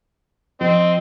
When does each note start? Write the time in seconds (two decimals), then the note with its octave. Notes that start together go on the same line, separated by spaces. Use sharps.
0.61 F3 C4 D#5